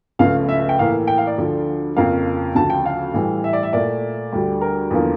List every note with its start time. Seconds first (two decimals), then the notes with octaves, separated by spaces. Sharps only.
0.19 C#2 C#3 F3 A3 F5
0.49 E5
0.60 E5
0.69 G5
0.79 A2 E3 A#3 F5
1.08 G5
1.18 F5
1.27 D5
1.38 D2 D3 F3
1.97 F2 C#3 F3 A#3 F5
2.55 D2 C#3 F3 A5
2.70 G5
2.86 F5
3.14 A2 E3 G3
3.44 E5
3.53 D5
3.63 E5
3.73 A#2 A3 D5
4.33 D2 D3 G3
4.61 A#4
4.91 E2 D3 F3 A#3